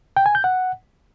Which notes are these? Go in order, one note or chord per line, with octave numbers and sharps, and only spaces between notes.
G5
G#5
G6
F#5